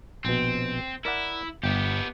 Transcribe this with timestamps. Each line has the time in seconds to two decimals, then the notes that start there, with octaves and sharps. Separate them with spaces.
0.25 A#1 B2 C4
1.05 E4 A#4 D5 F#5
1.63 G1 B3 G4